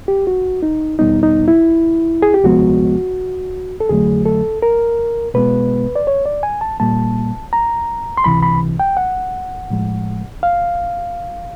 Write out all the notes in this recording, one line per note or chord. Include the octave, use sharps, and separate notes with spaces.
G4
F#4
D#4
E2 B2 G3 B3 D#4
D#4
E4
G#4
G4
D2 C3 F3 G#3 B3 F#4
A4
F2 D3 F#3 A3 G#4
A4
A#4
B2 G#3 B3 B4
D5
C#5
D5
G#5
A5
A#2 G3 A#3 A5
A#5
C6
C#2 C3 E3 B5
B5
G5
F#5
A2 F3 G#3
F5